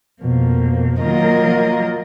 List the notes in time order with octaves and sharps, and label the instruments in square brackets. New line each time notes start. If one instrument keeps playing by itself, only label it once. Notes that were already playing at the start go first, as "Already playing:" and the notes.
[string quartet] F2 F3 A#3 [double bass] B2
[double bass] D#3 [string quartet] F#3 A#3 F4 A#4 D#5
[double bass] F3